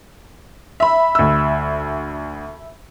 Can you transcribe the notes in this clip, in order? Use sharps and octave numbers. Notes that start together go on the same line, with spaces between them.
E5 B5
D2 E6